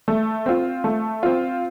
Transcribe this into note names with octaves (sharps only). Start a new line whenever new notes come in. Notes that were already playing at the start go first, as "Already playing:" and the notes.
A3
C4 F4
A3
C4 F4